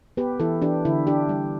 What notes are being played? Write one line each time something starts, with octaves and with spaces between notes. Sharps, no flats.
B3 G4 B4
E3 E4 A4
E3 D4 G4
D3 E4
D4 G4
G3